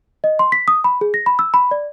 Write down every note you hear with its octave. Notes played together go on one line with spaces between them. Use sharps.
D#5
C6
B6
D#6
B5
G#4
A#6
B5
E6
B5
D5